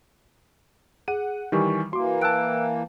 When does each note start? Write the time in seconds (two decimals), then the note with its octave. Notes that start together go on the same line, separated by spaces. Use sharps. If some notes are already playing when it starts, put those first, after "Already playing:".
1.08 G#4 F#5 D#7
1.52 D#3 E3 G3 G4 G#5 C#6
1.93 E3 A#3 F#4 C6 D6
2.21 G5 A5 E6 F#6 D7